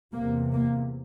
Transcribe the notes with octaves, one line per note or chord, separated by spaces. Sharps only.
E2 C3 A#3
A#3